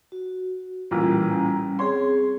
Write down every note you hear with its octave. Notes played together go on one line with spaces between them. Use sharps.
F#4
A1 A#2 G3 C#4
C4 G#4 C#5 C6